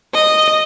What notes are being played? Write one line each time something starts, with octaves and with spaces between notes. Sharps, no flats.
D#5